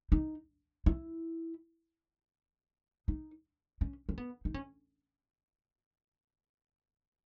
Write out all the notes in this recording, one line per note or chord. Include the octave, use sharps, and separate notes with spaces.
D#4
E4
D#4
C#4
C#4
B3
D#4
C#4